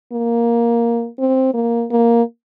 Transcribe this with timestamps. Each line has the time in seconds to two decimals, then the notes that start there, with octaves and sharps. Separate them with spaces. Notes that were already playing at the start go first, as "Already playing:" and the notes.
0.12 A#3
1.19 C4
1.54 A#3
1.91 A#3